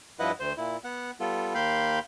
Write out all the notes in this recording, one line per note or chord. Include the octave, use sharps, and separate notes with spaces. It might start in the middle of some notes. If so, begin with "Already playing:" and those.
G2 F3 E4 B4 D#5 F#5
D2 C5
A#2 E4
B3 F#5
G3 B3 F4 A4
D#2 A#3 F5 G5 B5 C6